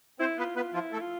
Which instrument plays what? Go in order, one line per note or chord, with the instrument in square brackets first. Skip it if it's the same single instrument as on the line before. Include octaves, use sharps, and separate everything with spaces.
[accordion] C4 C5 [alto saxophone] E4
[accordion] B3 B4 [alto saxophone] F4
[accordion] B3 B4 [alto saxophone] F4
[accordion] F3 F4 [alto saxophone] E4
[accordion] A3 A4
[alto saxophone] F4